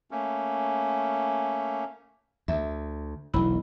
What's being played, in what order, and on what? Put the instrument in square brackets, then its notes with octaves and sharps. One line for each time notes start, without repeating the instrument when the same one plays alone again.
[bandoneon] A3 A#3 C#4
[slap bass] D2 [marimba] E5
[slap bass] E1 B1 [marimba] E4 B5